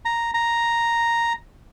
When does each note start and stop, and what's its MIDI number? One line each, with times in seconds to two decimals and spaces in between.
0.05 0.31 82
0.34 1.33 82